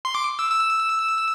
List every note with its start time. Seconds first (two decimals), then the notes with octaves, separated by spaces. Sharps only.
0.05 C6
0.15 D6
0.39 E6
0.51 E6